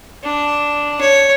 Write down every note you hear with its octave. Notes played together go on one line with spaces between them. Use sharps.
D4
C#5